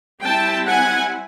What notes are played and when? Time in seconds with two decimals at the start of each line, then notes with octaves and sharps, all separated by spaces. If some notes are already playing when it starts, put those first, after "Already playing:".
0.22 G3 C4 E4 G5 A5
0.67 F#5 G#5